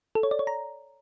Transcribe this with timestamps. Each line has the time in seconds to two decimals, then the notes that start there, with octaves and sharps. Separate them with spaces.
0.15 A4
0.23 C#5
0.31 D5
0.39 C#5
0.47 A#5